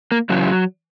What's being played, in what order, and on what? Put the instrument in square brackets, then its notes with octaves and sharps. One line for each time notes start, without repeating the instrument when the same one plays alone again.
[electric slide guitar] A#3
F#2 C#3 E3 F#3